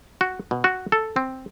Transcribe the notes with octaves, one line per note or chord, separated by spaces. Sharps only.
F#4
B2
F#4
A4
C4